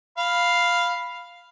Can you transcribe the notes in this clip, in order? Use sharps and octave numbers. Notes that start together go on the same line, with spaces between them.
F5 B5